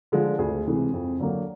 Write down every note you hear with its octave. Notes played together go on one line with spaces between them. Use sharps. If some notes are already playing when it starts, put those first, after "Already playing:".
D3 F3 G#3
D2 G#4
C3 E3 G#3
F2
D3 F#3 A#3